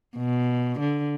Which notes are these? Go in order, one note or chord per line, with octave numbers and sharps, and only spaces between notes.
B2
D3